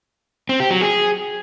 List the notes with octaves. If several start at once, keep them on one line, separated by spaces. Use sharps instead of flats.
C4
G4
F#3
G#4